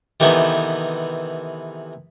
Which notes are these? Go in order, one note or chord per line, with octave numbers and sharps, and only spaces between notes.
C3 D#3 E3 A3 B3